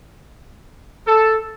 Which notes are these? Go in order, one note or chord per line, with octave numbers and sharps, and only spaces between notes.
A4